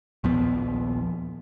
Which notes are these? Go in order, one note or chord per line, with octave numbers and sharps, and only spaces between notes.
A#1 D#2 F3 B3